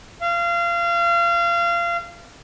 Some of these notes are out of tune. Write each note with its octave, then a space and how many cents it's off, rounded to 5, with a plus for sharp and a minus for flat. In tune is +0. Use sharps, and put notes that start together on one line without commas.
F5 -30